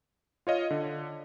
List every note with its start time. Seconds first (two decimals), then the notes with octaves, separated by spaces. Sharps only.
0.47 F4 C#5 D#5 F5
0.71 D3